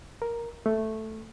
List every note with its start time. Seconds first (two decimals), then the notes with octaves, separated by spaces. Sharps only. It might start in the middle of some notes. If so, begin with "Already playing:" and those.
0.22 A#4
0.66 A3